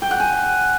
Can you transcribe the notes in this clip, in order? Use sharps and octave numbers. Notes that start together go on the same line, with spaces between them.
G5
F#5
G#5